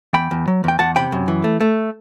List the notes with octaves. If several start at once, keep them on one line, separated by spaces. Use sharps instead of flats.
E2 G5 B5
E2
F#3
E2 G5
E2 F#5 A5
C3 G5 B5
F#2
E3
A3
A3